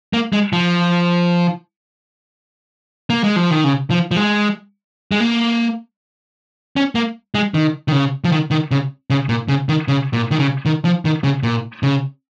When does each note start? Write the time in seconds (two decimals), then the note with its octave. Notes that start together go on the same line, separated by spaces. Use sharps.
0.13 A#3
0.33 G#3
0.53 F3
3.10 A#3
3.24 G#3
3.36 F3
3.50 D#3
3.64 C#3
3.91 F3
4.11 F3
4.16 G#3
5.12 G#3
5.20 A#3
6.76 C#4
6.95 A#3
7.35 G#3
7.54 D#3
7.88 D#3
7.92 C#3
8.24 F3
8.32 D#3
8.51 D#3
8.71 C#3
9.10 C#3
9.29 A#2
9.48 C#3
9.69 D#3
9.88 C#3
10.13 A#2
10.31 D#3
10.39 C#3
10.66 D#3
10.85 F3
11.05 D#3
11.24 C#3
11.43 A#2
11.83 C#3